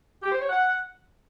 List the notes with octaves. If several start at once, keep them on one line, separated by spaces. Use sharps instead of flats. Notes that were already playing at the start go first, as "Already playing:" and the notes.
G4
C5
C#5
F#5